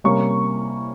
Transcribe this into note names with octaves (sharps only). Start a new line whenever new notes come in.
C3 G3 A#3 C#4 C#6